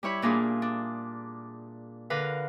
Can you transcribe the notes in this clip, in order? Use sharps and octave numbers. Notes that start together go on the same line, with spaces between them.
G3 E4 C#5 B5
A#2 A#3 D4 F4 G#4
D4
D3 A#4 B4 F5